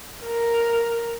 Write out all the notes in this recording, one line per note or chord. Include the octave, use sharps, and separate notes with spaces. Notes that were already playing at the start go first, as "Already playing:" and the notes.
A#4